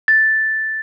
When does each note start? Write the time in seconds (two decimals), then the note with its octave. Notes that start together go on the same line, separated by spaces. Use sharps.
0.08 A6